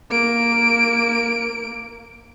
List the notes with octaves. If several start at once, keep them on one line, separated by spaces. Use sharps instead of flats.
A#3 D7